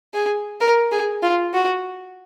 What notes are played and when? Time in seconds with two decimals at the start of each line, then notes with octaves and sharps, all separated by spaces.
0.14 G#4
0.61 A#4
0.91 G#4
1.22 F4
1.53 F#4